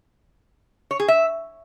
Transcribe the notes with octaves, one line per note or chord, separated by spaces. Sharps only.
C#5
G#4
E5